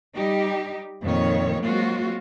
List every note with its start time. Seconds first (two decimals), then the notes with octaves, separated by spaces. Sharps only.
0.15 G3 D#4 G4
1.03 F2 A#2 D#3 C#5
1.61 F#3 G#3 A#3 C4 F4 F#4